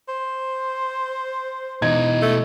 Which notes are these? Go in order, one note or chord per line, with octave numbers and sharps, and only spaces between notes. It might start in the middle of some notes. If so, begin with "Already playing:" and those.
C5
B2 E3 D#4 G#6
A3